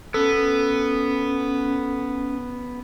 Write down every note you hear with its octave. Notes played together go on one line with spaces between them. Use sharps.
B3 C#4 A4